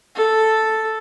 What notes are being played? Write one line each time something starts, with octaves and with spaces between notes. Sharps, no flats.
A4